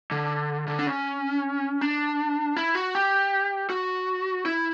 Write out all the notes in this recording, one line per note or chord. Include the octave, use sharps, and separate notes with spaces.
D3
D3
D4
C#4
D4
E4
F#4
G4
F#4
E4